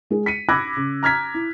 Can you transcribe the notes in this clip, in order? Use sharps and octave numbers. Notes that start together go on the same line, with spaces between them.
G#3 G#4
B6 C#7 D#7
B5 D6 E6 F#6 G#6 A#6
C#3
A#5 F6 G#6 B6
E4